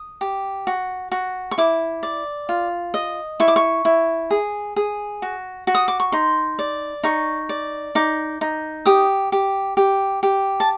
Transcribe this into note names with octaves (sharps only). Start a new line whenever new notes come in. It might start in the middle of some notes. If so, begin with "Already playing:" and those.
Already playing: D#6
G4
F#4
F#4
C#6
E4 D6
D5
F4
D#5
E4 C#6
D6
C#6
E4
G#4
G#4
F#4
F#4
D#6
D6
C#6
D#4 C6
D5
D#4 C#6
D5
D#4 D6
D#4
G4 D#6
G4
G4
G4
A5